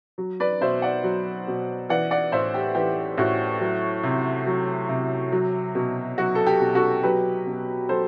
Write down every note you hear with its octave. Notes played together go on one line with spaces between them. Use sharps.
F#3
B4 D5
B2 C5 E5
D5 F#5
F#3
B2
E3 D5 F#5
D5 F#5
A2 C5 E5
G4
E3 G4
A2 F#4
F#3
C3
F#3
C3
F#3
B2
F#3 F#4
A4
G4
B2
F#4 A4
F#3 G4 B4
B2
F#3 A4 C5